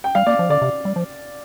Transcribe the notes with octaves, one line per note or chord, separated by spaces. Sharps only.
G5
G3 F5
A#3 D5
F3
D3 D5
C3
G3
F3